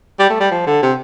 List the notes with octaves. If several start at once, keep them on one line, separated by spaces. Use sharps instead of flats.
G3
A3
G3
F3
D3
C3